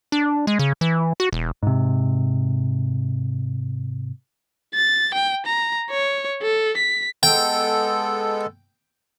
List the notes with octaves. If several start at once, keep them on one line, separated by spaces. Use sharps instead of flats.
D4
G#3
C#3
E3
F#4
E1
G#2 C3
A6
G5
A#5
C#5
A4
B6
G#3 B3 A4 G5